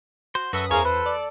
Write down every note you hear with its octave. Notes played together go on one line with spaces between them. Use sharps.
F#4 C5
F#2 F#4 A4 B4 E5 D#6
E2 G#4 A#4 C5 C#5 F5
A4 B4
D5